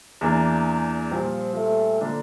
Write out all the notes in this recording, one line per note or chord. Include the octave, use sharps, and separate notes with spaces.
E2 E3 A#3 D4
A#2 F3 G3 C4 F4
A3
D3 F3 A#3 D4